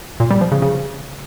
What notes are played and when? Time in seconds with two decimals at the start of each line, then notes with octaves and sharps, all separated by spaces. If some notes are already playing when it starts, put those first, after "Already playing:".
0.20 A#2
0.31 G3
0.41 F3
0.52 C#3
0.62 C#3